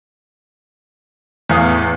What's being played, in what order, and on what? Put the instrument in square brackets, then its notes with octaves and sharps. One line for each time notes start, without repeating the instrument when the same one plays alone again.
[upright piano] E2 [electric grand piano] A2 F5 D#6